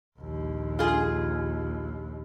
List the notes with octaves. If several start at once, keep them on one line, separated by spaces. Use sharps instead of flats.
A#1 D#2
F4 G#4